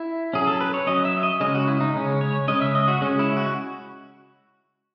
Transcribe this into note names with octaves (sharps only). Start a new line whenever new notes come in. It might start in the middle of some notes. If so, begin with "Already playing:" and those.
Already playing: E4
F#3 C#4 G#4
A4
B4
C#5
F#3 C#4 D#5
E5
D#5
C#3 G#3 C#4 D#5
F#4
E4
D#4
C#3 G#3 C#4
C#5
C#3 G#3 C#4 D#5
E5
D#5
F#4
C#3 G#3 C#4
E4
F#4